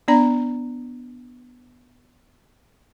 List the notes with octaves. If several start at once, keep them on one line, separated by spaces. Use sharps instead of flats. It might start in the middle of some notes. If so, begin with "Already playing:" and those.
B3 D4 D5 A#5